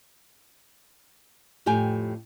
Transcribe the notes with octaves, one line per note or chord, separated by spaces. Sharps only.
F2 A2 G4 G5 G#5